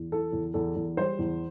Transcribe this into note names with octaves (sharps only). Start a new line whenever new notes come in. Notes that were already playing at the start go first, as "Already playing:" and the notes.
Already playing: E2
E3 A4
E2
E2 A4
E2
G3 C5
E2